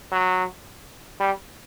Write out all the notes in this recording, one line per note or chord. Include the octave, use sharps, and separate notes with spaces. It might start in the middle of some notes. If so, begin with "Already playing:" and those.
F#3
G3